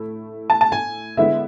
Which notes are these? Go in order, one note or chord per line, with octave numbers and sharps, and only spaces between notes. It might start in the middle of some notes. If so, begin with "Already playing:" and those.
Already playing: A2 A3 E4
A5
A5
G#5
D3 G#3 B3 E4 E5